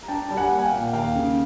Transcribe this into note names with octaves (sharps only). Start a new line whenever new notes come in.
A#5
D4 G5 A5
G3 A5
F#5 G#5
A#3
G#5
F5 G5
A#2
D#2 F5 G5
C#3